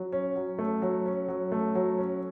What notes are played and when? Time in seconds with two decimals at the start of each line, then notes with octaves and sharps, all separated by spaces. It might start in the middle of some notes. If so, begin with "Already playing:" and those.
Already playing: F#3
0.12 C#4
0.36 F#3
0.58 A3
0.82 F#3
1.06 C#4
1.28 F#3
1.52 A3
1.75 F#3
1.98 C#4